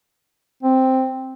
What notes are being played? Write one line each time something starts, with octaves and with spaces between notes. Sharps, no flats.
C4